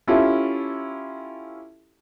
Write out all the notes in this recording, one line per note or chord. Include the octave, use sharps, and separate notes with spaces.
C#4 E4 F4 G4 A4